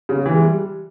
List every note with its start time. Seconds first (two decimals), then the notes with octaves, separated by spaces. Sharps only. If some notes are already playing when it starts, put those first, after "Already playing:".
0.09 C#3
0.26 E3
0.34 G#3
0.43 G3